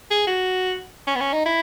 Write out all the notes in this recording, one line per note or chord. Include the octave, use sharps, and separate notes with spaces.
G#4
F#4
C#4
B3
C#4
D#4
E4